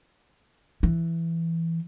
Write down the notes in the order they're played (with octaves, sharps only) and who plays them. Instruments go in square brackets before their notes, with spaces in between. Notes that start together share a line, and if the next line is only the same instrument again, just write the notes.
[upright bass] E3